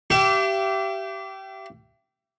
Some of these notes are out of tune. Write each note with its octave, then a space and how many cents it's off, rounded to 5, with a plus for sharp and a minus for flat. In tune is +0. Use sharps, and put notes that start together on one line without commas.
G4 -20 E5 +40